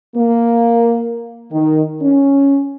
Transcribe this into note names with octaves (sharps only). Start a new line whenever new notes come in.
A#3
D#3
C#4